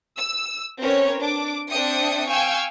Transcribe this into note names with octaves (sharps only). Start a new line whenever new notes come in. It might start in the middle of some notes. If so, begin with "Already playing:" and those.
E6
C4 C#4 A#4 B4 C#5
D4 D6
C4 D4 E5 G5 D#6 C#7
F5 G5 G#5 C#6 E6